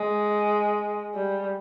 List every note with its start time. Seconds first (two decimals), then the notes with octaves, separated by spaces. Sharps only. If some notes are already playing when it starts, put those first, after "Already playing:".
Already playing: G#3
1.14 G3